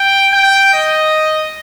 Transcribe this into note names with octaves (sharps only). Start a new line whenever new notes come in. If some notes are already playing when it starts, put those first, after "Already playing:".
Already playing: G5
G5
D#5